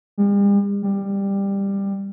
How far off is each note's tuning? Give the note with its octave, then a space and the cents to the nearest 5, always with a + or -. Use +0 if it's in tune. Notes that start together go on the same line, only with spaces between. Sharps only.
G3 +45
G3 +15